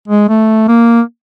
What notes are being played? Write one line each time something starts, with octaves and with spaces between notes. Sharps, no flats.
G#3
A3
A#3